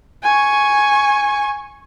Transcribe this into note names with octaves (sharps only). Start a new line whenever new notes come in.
G#5 C#6